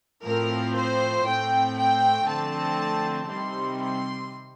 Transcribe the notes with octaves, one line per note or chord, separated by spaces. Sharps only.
A2 F3 C4 A#4
C5
A2 A3 C4 G5
G5
D3 F3 A3 C4 A5
C3 D#3 G3 C4 C6
C6